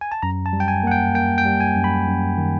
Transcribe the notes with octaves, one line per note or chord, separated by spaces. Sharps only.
G#5
A5
F#2 A#5
A5
G3
G5
G#5
A#3 F#5
G5
A#3 G5
G5
G3
G#5
F#2
B5
F#2
D#3